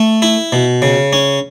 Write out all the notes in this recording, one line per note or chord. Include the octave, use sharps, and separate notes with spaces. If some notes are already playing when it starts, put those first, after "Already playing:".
Already playing: A3
E4
B2
C#3
C#4